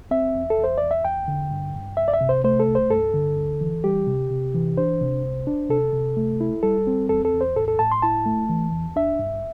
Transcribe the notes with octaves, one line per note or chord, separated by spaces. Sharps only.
C4 E5
E2
A4
E2
C5
E2 D5
E5
E2 G5
D3
G2
G2
C2 E5
D5
E5
C3
C5
A3 C5
A4
C2
C5
G2 A4
D3
D2
E3
G3 G4
C3
C3
E3
D4 C5
C3
C2
D4
C3 A4
C3
A3
E4
G3 A4
C4
E2 A4
A4
E2
C5
A2 A4
A4
A2 A5
C6
E4 A5
A3
E3
E2
D4 E5
G2